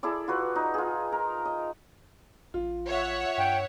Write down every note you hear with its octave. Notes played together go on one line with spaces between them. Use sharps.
E4 G#4 A4 D5
F4 F#4 B4
D#4
F4 G#4
A#4
D#5
A1 F4
C#5 E5 F#5
G2 G5